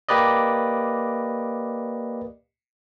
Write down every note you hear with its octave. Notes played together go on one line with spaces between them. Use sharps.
A#3 G4 B4 D5 D#5